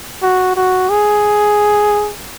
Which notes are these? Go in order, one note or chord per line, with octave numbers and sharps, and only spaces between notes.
F#4
F#4
G#4